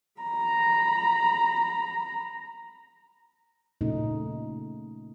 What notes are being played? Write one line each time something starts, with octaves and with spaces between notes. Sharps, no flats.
A#5 B5
A#2 C#3 A3 C#4 D#4